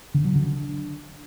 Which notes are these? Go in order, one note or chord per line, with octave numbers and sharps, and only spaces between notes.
D3
F#3
D3
D4